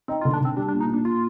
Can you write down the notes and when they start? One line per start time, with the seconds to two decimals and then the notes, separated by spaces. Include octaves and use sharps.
0.08 C4 D#4
0.21 F4
0.25 D3
0.34 D4
0.41 D3 C4
0.57 G3 D4
0.68 D4
0.73 A#2
0.80 D#4
0.89 A#2 D4
1.05 A#2 F4